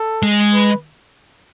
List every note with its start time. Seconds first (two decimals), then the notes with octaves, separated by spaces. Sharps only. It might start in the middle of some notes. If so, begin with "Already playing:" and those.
Already playing: A4
0.23 G#3
0.54 B4